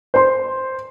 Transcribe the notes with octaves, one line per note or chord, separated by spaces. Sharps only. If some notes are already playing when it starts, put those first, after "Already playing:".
C5 C6